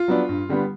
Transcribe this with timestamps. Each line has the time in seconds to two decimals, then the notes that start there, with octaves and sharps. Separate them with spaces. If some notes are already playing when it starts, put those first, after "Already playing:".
Already playing: F4
0.08 F#3 B3 D4
0.29 G2
0.49 D3 G3 B3